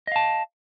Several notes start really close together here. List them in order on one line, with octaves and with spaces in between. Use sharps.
D#5 F5 A5